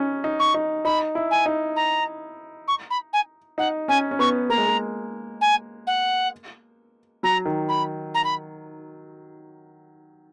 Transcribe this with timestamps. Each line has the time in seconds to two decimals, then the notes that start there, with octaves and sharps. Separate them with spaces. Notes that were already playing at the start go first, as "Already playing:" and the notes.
Already playing: C#4 D#4
0.24 D#4
0.39 C#6
0.54 D#4
0.85 D#4 B5
1.15 E4
1.30 G#5
1.46 D#4
1.76 A#5
2.67 C#6
2.90 B5
3.13 G#5
3.58 D#4 F#5
3.88 C#4 G#5
4.11 C#4
4.19 B3 C#6
4.49 A#3 A#5
4.58 G#3
4.67 A#3
5.41 G#5
5.86 F#5
7.23 F#3 A#5
7.45 D#3
7.68 B5
8.14 A#5
8.24 B5